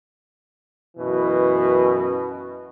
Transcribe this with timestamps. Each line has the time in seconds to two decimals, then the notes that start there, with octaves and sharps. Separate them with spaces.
0.98 F#2 B2 E3